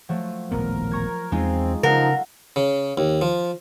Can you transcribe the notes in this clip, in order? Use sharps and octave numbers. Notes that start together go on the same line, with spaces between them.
F3 F#3 A3
D#1 A1 B3 A#4
A#5 C#6 G#6
E2 G#3 C4 D#4 F4
C#3 F3 D#4 A4 A#4 F5 F#5
C#3
D#2
F3